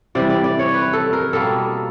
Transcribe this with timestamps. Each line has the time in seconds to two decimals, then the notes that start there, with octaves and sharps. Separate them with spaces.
0.15 C3 E3 G3 D5
0.30 D5
0.44 D5
0.59 C#5
0.74 B4
0.93 A4
1.13 A#4
1.33 B2 G3 A#3 A4